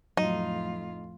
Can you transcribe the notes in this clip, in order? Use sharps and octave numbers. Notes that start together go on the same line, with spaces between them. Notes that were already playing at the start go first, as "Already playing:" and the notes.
F2 A2 F#3 D#4 F4